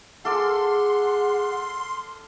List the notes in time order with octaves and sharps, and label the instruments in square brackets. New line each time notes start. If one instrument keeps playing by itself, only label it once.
[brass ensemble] G#4 [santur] A4 F5 D6 [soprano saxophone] F#5 [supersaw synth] C6